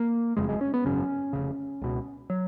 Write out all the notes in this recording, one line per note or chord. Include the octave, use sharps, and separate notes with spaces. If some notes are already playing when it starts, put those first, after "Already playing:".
Already playing: A#3
F#1 F2 C#3 G#3
G#3
C#4
B3
G#1 F#2 C#3 C#4
F1 D#2 C#3
C#2 B2
F#3